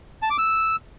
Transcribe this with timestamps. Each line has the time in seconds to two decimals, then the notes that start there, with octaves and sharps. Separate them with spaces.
0.22 A5
0.30 D6
0.38 E6